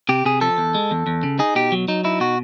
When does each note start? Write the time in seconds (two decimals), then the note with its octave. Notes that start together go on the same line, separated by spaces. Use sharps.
0.09 C3 G4
0.25 C3 G#4
0.41 F3 A4
0.58 E2
0.74 G#3
0.91 E2
1.07 E2
1.23 C#3
1.39 D#4 G#4
1.55 B2 G4
1.72 F#3
1.88 F#3 D#4
2.04 D#4 E4
2.20 B2 F#4